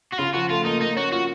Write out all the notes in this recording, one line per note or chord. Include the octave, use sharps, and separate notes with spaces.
F#4
C#3 F4
F3 F#4
A3 F4
A#3 D#4
A#3 D#4
C#4 F#4
F4 F#4